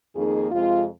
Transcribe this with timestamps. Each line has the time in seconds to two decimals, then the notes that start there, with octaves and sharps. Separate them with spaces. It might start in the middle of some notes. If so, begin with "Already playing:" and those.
0.14 F2 D#3 A#3 D#4 G#4
0.51 F2 C3 G#3 C4 F4